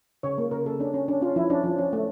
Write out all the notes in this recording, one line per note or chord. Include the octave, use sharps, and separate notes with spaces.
C#3 C#5
A#3
C#3 A#4
C#3 A4
C#4 D4
C#4
C#4 D4
C#4 F4
F3 E4
C#4 D4
F3
C#4
A3